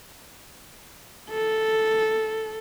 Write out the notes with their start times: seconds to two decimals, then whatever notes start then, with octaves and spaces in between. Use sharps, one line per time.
1.30 A4